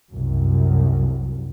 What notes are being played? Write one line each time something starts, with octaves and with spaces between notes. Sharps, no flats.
C2 F#2